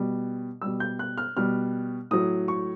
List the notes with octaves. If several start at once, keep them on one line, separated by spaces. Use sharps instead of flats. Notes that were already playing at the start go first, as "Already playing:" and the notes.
Already playing: B2 G3
B2 G3 E6
G6
F#6
F6
B2 G3 F6
A2 F#3 D#6
C#6